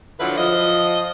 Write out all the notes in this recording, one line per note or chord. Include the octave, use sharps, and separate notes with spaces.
D3 F3 F#3 D4 E4 B4
F3 D#5